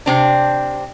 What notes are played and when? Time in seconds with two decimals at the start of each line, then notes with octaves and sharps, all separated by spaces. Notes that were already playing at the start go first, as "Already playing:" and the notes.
0.06 C3 C4 D4